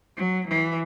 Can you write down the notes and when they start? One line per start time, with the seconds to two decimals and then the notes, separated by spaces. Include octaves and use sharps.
0.17 F#3
0.47 E3